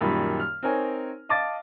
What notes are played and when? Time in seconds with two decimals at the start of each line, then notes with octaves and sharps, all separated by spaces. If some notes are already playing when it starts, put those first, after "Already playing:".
0.01 F#2 A#2 D#3 G3 B5
0.40 F6
0.63 C4 D#4 A#4 C#5 G#5
1.29 D#5 F5 A5 D6 A6